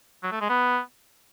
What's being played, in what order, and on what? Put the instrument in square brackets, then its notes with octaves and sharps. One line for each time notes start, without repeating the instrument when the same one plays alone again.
[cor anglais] F#3
A3
G#3
B3